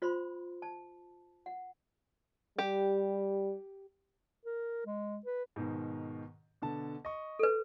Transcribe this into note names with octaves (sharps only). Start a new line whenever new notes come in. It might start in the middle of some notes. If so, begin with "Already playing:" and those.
F4 C5 B5 C6
A5
F#5
G3 G4
A#4
G#3
B4
G#2 B2 D#3
B2 D3 A5
D#5 C#6
A4 B4